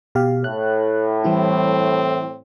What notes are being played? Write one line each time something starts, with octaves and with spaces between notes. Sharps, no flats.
B2 G4 F5
A2 F#6
E3 G3 C4 E4